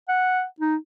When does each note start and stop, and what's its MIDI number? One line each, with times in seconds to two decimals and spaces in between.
0.08 0.44 78
0.60 0.76 63